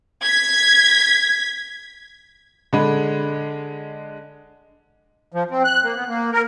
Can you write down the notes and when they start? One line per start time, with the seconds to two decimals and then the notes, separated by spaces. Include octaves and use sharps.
0.23 G#6 B6
2.73 D3 G#3 G#4 A4 B5
5.32 F3
5.51 C4
5.65 F#6
5.84 A#3
5.96 B3
6.09 A#3
6.33 A#4